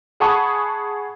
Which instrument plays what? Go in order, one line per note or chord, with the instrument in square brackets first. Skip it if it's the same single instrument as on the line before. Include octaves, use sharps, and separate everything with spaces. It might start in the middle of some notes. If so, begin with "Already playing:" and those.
[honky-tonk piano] G#4 F#5 A5 B5 C#6 D#6